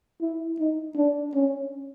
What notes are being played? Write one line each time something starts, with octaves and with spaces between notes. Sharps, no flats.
E4
D#4
D4
C#4